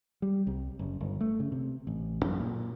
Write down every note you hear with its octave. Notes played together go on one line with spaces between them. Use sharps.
G3
C2
F#1
G1
A3
C#3
C3
A1
F#2
A#2